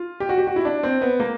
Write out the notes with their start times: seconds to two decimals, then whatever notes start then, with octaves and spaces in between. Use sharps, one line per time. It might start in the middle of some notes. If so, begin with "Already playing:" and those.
Already playing: F4
0.20 G4
0.29 F#4
0.38 G4
0.47 F#4
0.56 E4
0.65 D4
0.83 C4
1.02 B3
1.20 A#3